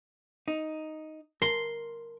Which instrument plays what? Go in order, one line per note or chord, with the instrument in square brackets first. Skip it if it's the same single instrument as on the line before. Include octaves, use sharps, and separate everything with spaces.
[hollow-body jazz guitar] D#4
[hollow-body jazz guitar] A#4 [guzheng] C6